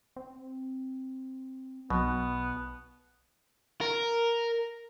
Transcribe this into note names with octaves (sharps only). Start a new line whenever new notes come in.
C4
B1 B2 B3
A#4